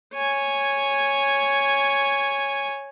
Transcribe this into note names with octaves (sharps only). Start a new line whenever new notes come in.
C#5 G#5